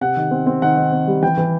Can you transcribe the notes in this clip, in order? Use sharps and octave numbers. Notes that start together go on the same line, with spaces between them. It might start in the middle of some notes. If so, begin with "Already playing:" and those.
C3 F#5
D#3
C4
C4
D#3 F#5
D#3
C4
G3
E3 G5
E3